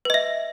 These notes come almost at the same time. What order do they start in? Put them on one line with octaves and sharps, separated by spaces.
B4 D#5 E5